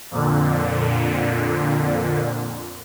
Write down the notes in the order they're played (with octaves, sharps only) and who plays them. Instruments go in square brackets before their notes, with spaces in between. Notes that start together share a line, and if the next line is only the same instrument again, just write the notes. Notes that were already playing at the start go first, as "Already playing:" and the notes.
[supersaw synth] F2 A#2 D3